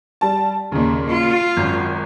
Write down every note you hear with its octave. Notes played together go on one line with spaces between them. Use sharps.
G3 A5
D#2 A#2 C#3
F4
G#1 F#2